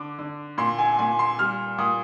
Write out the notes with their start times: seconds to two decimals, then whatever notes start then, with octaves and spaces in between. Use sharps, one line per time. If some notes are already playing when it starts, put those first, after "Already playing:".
Already playing: D3 D6
0.19 D3
0.58 A#2 C6
0.79 G#5
0.99 A#2 G#5
1.19 C6
1.39 G3 F6
1.78 A#2 D#6